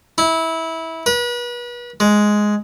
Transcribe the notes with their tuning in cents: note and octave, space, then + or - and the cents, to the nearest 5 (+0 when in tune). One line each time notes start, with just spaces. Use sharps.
E4 -20
B4 -35
G#3 +5